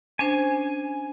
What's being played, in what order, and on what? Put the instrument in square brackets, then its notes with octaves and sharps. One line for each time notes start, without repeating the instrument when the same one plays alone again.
[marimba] C#4 D4 C5 [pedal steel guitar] G#5